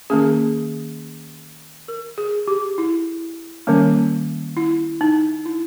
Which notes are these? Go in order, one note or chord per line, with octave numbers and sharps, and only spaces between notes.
D#3 A#3 C#4 G#4
A#4
G#4
G4
E4
D#3 G3 A#3 C#4
E4
D#4
E4